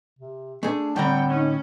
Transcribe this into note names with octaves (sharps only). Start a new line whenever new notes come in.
C3
A3 D4 G#4
A2 D3 G3 C4 F#5 G5 A#5
C#4 D#4